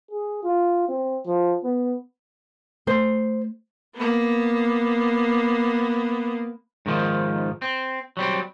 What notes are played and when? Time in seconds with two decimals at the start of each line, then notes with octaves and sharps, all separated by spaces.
0.11 G#4
0.43 F4
0.88 C4
1.26 F3
1.64 B3
2.87 A3 C5
3.95 A#3 B3
6.86 G#2 D#3 F3
7.62 C4
8.17 F#3 G3 C4